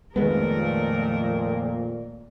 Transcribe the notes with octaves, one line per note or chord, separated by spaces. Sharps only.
F2 A#2 D#3 G#3 A3 B3 A#4